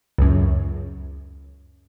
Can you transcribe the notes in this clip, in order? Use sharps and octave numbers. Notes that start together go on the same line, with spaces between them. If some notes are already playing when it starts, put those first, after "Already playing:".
C#2 F#2